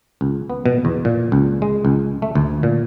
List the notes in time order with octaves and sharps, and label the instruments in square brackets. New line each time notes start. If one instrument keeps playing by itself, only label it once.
[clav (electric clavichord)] C#2
B3
B2
E2
A#2
C#2
G#3
C#2
A3
D2
A#2